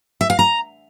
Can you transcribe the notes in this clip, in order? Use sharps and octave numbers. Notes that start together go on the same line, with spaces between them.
E5
F5
A#5